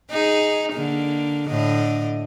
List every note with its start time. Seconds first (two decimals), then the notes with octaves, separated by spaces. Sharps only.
0.10 D#4 G#4
0.73 D3 A#3
1.48 A2 D3 D#5